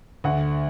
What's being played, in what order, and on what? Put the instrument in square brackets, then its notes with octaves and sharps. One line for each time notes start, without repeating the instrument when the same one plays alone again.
[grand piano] D2 F#5